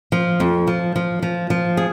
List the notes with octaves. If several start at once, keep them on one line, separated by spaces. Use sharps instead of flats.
F3
F2
F3
F3
F3
F3
G#4